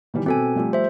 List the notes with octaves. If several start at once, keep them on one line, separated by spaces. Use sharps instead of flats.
D#3 E3 G3
B2 C4 A4 G#5
F3 G3 A3
C5 E5